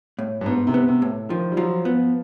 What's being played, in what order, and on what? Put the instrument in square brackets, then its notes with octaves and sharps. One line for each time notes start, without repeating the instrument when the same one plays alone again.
[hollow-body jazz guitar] A2
[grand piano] G2
[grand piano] G#2 [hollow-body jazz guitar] B3
[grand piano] C3
[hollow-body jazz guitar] B3
[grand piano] C3
[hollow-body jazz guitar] A2
[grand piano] D#3 [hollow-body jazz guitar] F3
[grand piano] G3
[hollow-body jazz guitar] F3 [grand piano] F#3
[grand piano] F3 [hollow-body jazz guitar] B3